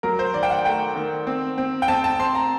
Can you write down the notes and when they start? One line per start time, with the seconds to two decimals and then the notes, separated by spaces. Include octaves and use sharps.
0.03 F#3 A#4
0.19 C5
0.34 D#3 D5
0.43 G5
0.50 F#5
0.65 A3 G5
0.96 D#3
1.27 C4
1.58 C4
1.82 G5
1.88 C4 A5
2.04 A5
2.19 C4 C6
2.35 A#5